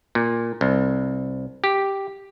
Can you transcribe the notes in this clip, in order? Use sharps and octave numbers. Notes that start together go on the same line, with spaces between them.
A#2
C2
G4